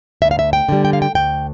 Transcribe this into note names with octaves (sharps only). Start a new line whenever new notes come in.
D2 E5
F5
E5
G5
D3 G3
G5
F5
G5
D2 G5